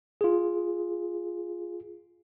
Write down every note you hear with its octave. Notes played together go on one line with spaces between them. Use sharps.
F4 G#4